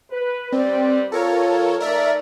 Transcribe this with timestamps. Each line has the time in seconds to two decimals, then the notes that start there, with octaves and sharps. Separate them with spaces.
0.10 B4
0.52 G3 C4 B4 D5
1.12 F2 F3 F4 A4 A#4 C#5
1.80 A3 D#4 A#4 D5 E5